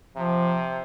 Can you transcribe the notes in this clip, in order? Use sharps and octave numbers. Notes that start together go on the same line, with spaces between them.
C3 F3